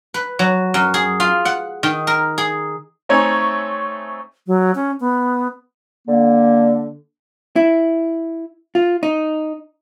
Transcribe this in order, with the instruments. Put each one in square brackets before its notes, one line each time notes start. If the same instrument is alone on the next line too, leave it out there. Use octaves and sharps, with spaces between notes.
[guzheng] B4
F#3
F#2
G#4
F4
F#5
D#3
A#4
G#4
[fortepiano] A3 C4 D#4 C#5 G#5
[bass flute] F#3
C#4
B3
[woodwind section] D3 A#3
[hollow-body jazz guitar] E4
F4
D#4